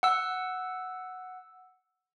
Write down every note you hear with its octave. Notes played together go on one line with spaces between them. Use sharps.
F#5 E6